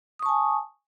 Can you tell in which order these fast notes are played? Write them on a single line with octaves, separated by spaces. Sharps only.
D#6 C#6 A5 G#5